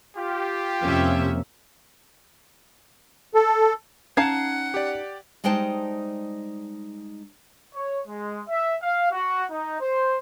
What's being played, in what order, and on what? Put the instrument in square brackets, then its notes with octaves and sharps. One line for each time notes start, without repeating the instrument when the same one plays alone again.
[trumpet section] F4 G4
[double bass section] F2 C3 A#3 [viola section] C#4 E5
[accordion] A4
[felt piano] C#4 [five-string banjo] D#4 F5 A5 [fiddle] F#5 [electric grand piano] G#6 C7
[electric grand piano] G4 D5
[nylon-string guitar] G3 G#3 D#4 C5 G5 A5
[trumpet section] C#5
G#3
E5
F5
F#4
D#4
C5